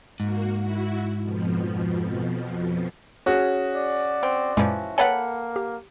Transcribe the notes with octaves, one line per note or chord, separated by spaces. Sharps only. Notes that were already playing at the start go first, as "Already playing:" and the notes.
G#2 A#3 F#4
E4 F#4
F2 B2 F3
C#4 F#4 G#4
D5
C4
F#2 A#2 E3 F3 G#3
A#3 A4 B4 C#5 F#5 G5
G4